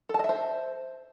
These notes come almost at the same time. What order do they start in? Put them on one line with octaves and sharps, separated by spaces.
A4 A5 D#5 E5 C5